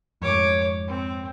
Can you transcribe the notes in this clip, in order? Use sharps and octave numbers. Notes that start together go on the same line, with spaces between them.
F2 G#2 C#5 D6
C4